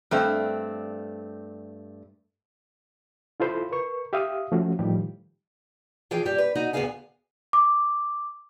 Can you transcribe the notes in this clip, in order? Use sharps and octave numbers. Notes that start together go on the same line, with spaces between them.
G2 A3 C4
E4 F4 A4 C5 B5
A#4 B4 C#6
G4 E5 F5 D#6
F3 A3 C#4 F#4
A2 D#3 F3 G3 G4
E3 F3 G#4 F5 G5
G2 G3 G4
B4
D#4 F#4 D#5
D2 A2 B3 G#4 F5 G#5
D6